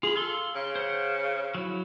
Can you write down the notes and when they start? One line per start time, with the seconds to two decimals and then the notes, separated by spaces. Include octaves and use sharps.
0.03 F4 G#4 B5
0.15 A4 F5 C6
0.55 C#3
0.75 C5 F#5
1.55 F#3 E4